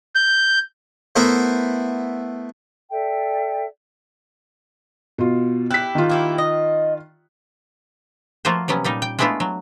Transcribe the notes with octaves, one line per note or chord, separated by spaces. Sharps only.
G6
A3 B3 E4 A#4 C5
A4 D5 E5 G5
B2 F4
E4 G4 F#6 B6
D#3 F4
A#3 E4 G4
D#5
F3 A3 A#3 F4 F#4 C5
C3 F#3 B3 C#4
A#2 G3 D#4
G5
G#3 A3 B3 D4 E4 F4
F#3